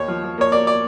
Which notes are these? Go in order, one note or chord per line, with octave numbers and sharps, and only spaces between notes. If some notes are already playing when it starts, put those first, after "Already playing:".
Already playing: D#2 C#5
F3
F3
A#3 C#5
A#3 D5
D5